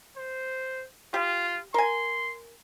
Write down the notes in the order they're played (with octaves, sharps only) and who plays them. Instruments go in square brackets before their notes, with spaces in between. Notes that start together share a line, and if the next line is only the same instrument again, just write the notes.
[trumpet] C5
[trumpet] F4 [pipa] G4
[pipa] A#4 G#5 [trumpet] C6